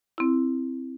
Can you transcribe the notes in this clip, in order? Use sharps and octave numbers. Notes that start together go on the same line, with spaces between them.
C4 E4